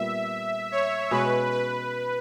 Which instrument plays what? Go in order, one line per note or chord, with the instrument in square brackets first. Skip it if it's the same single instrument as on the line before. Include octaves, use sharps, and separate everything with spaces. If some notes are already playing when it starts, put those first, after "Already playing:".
Already playing: [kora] A#2 G3 B3 [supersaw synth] E5
[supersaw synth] C#5
[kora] B2 G#3 C#4 [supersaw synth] B4
[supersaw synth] B4